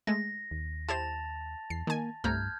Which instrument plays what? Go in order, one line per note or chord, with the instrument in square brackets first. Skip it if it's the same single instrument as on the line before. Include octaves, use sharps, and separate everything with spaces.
[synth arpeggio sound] G#3 A3 [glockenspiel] A#6
[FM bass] D#2
[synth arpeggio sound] E4 G4 C5 [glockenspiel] A5 A6 F7
[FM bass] E2 [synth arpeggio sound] C7
[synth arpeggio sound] D#3 G#5 [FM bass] A#3
[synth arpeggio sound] C2 A3 A#5 [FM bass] G2 [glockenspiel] F6 G6 G#6